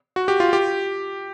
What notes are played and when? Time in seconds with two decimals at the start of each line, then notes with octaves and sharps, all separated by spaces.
0.16 F#4
0.28 G4
0.40 F4
0.53 G4